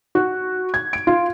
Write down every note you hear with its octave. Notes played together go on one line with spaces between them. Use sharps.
F#4
G#6
D7
F4